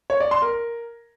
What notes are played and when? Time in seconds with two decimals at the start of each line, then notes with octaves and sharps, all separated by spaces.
0.10 C#5
0.20 D5
0.31 C6
0.42 A#4